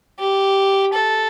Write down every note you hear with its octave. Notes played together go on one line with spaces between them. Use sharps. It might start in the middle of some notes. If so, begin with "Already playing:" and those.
G4
A4